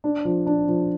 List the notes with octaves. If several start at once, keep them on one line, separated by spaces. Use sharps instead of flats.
D4
F3
D4
F3